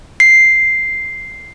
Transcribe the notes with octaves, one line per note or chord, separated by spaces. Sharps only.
C7